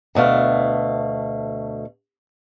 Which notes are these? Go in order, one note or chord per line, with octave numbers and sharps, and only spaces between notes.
D2 B2 A3 F5